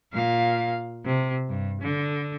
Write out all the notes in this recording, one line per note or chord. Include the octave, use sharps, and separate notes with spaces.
A#2 F5
C3
G2
D3